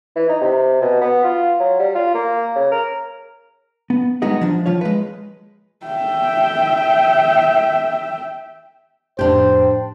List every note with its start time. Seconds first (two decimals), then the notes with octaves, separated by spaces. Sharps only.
0.16 E3
0.29 D#4
0.41 C3
0.82 B2
1.01 B3
1.24 F4
1.60 F#3
1.79 G3
1.95 F4
2.15 A#3
2.55 C#3
2.72 A#4
3.90 B3
4.22 G3 G#3 B3 D#4 F#4 G#4
4.41 F3 D4
4.66 F3 F4 C#5
4.81 G#3 B4
5.86 E5 G5
9.19 F2 A2 D4 G4 C5 G5